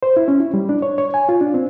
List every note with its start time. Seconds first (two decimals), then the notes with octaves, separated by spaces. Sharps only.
0.03 C5
0.17 E4
0.28 C#4
0.40 E4
0.54 G3
0.69 D4
0.82 C#5
0.98 C#5
1.14 G#5
1.29 F4
1.41 D4
1.54 C4